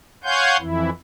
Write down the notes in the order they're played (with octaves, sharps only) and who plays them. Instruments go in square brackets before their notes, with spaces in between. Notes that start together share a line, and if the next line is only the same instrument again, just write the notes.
[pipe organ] C#5 F5 F#5 G#5 C6 G6
F2 E3 E4